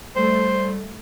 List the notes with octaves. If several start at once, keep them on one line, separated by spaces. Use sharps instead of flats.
G3 A3 C5